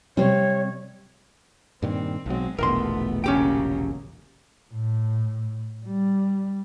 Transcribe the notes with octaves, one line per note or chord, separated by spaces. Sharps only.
C3 G3 C4 C#5
G2 A#2 D#3 C4
B1 F#3 G#3 C4
E1 A#1 D3 A3 B3 A#4 C6
C#3 F#3 A#3 C#4 G4 G5
A2
G3